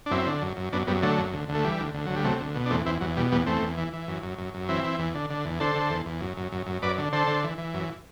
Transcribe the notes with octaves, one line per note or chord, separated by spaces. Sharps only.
D4
F#2 C4 E4
D3
F#2
F#2
F#2 B3 D4
F#2 G3 B3
D3 F#3 A3
F#2
D2
D2
A3
E3 G3
D2
D2
D2 F#3
G3
C3 F#3 A3
D2
B2
D4
E2 A3 C4
E2 C4 E4
E2 F#3
B2 G3
E2 G3 B3
E2 A3 C4
E2
E3
E3
F#2
F#2
F#2
F#2
E3 C4 E4
E3
E2
D3
D3
E2
D3 A4 C5
D3
E2
E2
F#2
F#2
F#2
F#2
F#2 B4 D5
D3
D3 A4 C5
D3
E3
E3
F#2